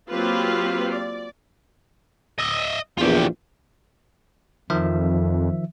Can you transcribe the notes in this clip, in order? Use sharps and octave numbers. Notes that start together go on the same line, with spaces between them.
F#3 A#3 C4 F4 G4 B4
D5
D#5 E5
A#1 E2 F4 G4
F2 D#3 F3 E5